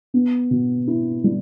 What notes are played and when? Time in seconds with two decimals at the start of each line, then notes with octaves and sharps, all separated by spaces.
0.14 B3
0.51 B2
0.87 E4
1.24 G3